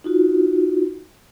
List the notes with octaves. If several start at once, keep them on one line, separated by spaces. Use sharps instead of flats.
D#4 F4 F#4